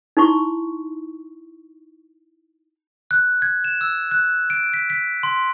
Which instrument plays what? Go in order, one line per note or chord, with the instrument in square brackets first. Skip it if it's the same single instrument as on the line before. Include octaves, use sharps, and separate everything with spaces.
[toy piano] D#4 E4 C6 C#6
[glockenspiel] F#6
G#6
E7
E6
F#6
D7
B6
B6
C6